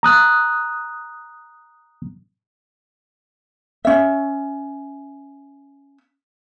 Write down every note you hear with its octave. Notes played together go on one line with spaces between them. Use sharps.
A#5 D#6 F#6
C#4 E5